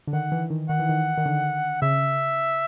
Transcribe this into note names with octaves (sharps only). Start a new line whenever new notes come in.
D3
D#3 F#5
E3
D#3
D#3 F#5
E3
D#3
D#3
D3
C#3 E5